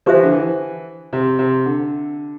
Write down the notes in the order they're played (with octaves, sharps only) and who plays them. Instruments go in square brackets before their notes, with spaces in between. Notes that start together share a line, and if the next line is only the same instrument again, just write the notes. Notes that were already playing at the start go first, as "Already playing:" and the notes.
[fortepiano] F3 [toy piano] G4 C5 E5
[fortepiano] E3
D3
E3
C3
C3
D3